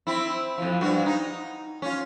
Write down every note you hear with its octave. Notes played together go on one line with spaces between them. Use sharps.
C4 E4
F2 F3
G2 F#4
D#4
C#4 F4